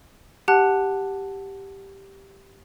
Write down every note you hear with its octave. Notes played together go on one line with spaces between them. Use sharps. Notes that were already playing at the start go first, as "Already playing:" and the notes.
G4 F#5 A5 F#6